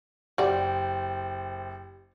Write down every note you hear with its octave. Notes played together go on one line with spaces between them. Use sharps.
F#1 F#4 G4 C5 D5 G5